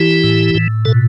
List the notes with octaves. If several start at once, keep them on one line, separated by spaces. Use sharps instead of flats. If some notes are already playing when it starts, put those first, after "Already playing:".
Already playing: E3 E4 G4
A2
A2
B2 A4